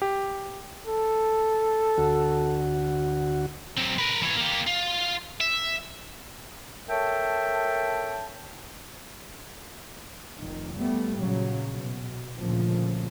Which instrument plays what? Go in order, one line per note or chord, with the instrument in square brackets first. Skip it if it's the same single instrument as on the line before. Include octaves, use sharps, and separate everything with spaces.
[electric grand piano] G4
[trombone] A4
[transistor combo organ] D2 F#4
[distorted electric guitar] F#3 C4
A#4 B4
E3 C#5
A#3 G4
F4
E5
[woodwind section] A4 A#4 C#5 E5 G5 A5
[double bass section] F1 D#3
G3 A3 B3
A#1 C#3 F#3
B2
D2 A#2 C#3 F3